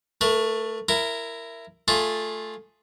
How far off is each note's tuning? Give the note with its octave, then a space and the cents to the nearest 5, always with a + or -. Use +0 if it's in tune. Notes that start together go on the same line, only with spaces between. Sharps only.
A3 +10 A#4 +45
E4 +15 A#4 -10
A3 +0 F4 +10 G#4 +0